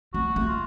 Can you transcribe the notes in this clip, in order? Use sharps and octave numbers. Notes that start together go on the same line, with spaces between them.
A3 F#4
A3
F4